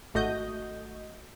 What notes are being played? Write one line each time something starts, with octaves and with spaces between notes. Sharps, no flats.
G#1 A3 F#4 D#5 G6